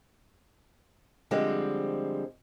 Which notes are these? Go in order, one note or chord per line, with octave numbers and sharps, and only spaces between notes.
D3 F3 G3 G#3 C4